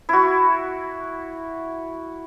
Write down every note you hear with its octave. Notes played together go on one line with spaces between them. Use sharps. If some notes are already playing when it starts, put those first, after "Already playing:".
E4 F#4